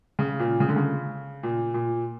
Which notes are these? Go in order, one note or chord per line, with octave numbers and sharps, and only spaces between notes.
C#3
A#2
C#3
D3
C#3
A#2
A#2